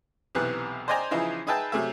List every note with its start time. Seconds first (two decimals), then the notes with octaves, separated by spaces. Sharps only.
0.35 B1 C3 E3 B3 F#6
0.88 C5 D5 D#5 G5 G#5 A#5
1.11 C#3 E3 F3 D#4 E4
1.47 D#4 G#4 B4 E5 G5 A5
1.72 C3 F#3 A3 G#4 E5